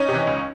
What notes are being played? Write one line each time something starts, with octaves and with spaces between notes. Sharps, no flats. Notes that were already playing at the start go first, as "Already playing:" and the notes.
Already playing: C#4 D#4
C3
E3
C#2